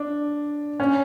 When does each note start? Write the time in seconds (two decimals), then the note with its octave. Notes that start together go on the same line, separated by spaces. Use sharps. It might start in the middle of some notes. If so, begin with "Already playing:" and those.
Already playing: D4
0.80 C#4